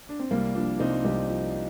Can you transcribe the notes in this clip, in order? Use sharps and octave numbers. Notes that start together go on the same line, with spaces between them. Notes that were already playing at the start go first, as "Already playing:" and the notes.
D4
C4
C2 G3 A#3
F3 A#3 D4
C2 C4 D#4
C2 D#4 G4
F3